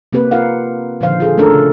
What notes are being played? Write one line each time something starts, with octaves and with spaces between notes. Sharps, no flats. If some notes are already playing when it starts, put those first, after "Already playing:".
C3 A#3 C4 G4 B4
F4 A#4 F5 F#5
A#2 D3 D#3 F3 C5 F5
F4 G#4 A4
A3 C#4 D4 A4 A#4
C#3